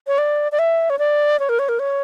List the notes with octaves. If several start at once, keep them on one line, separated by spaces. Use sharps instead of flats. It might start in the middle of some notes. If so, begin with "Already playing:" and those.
C#5
D5
D5
E5
C#5
D5
C#5
A#4
C#5
A#4
C#5